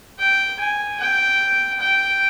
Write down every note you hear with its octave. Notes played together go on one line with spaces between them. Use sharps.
G5
G#5
G5
G5